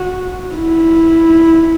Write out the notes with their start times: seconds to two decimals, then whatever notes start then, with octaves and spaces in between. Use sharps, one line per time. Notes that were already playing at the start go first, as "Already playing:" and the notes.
Already playing: F#4
0.55 E4